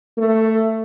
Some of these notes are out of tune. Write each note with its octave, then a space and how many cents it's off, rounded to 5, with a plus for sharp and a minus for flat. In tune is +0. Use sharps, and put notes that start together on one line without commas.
A3 +10